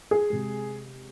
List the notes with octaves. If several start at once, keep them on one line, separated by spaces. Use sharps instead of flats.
G#4
C3 G#3